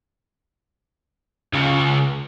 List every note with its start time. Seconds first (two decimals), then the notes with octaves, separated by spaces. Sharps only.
1.54 C#2 C#3